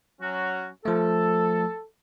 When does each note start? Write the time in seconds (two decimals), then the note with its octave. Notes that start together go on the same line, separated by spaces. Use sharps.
0.22 F#3 C#4 F#4
0.85 F3 A3 A4